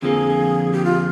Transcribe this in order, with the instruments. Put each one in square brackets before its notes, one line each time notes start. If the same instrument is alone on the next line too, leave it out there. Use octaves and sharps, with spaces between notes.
[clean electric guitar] F2 D3 F3 A#3 [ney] G#4
[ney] G4
F4